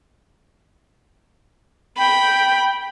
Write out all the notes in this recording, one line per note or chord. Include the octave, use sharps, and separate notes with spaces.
G5 B5